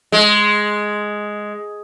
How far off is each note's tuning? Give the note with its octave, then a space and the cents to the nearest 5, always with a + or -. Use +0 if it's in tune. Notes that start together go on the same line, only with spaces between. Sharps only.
G#3 +5